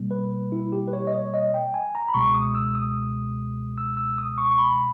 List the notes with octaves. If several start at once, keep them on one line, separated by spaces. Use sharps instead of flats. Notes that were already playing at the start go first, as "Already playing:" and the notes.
Already playing: B2 G3 A#3
B4
E4
G4
B4
C#5
D#5
C#5
D#5
G5
G#5
A#5
B5
C#2 B2 G#3 C#6
D#6
E6
D#6
E6
E6
D#6
C#6
C#6
B5